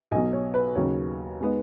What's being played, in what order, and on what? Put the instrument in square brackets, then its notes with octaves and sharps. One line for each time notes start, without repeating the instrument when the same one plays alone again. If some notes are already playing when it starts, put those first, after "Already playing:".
[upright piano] B1 B2 F#3 D#5 G#5
C#5
B4
D#2 C#3 F#3 D#4 C#5
B2 G#3 B3 D#4